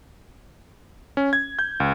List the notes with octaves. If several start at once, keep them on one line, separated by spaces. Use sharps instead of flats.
C#4
G#6
G6
C#2